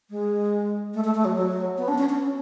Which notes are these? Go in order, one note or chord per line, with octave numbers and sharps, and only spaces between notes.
G#3
A3
A3
A3
F#3
F#3
B3
D4
C#4
C#4